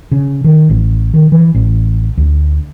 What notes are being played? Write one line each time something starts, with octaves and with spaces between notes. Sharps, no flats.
C#3
D#3
A1
D#3
E3
A1
D2